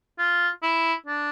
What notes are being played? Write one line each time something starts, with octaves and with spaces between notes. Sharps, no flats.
F4
E4
D4